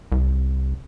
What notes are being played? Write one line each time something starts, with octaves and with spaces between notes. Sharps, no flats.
C2